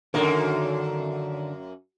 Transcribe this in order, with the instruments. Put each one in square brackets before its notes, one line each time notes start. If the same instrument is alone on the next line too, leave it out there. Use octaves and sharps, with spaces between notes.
[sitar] F#2 A#3 [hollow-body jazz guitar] D3 D#3 A#4